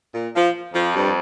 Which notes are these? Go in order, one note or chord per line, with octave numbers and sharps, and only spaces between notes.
A#2
F3
F2 F3
G2